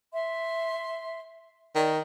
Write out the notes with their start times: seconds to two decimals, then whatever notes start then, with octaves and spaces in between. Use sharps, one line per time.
0.12 E5 C6
1.76 D#3 D5